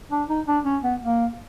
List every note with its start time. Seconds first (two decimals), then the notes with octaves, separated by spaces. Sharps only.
0.11 D4
0.29 D#4
0.47 D4
0.64 C#4
0.82 B3
1.01 A#3